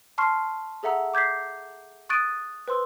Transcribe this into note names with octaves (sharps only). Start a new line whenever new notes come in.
A5 C6 C#6 F6 C7
G#4 A4 E5 F#5 A#5 E6
D6 G6 G#6 B6 C7
C#6 D#6 F#6 A6 D7 D#7
B4 C5 C6 E6